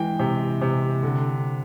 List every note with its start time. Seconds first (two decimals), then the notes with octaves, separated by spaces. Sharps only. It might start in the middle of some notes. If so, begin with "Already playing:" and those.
Already playing: E3 G#3 G5
0.20 C3
0.62 C3
1.03 D3